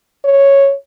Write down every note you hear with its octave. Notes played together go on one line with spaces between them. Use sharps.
C#5